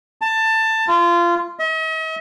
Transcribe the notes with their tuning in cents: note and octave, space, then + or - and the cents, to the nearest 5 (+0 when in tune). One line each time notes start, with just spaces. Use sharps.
A5 +15
F4 -25
D#5 +45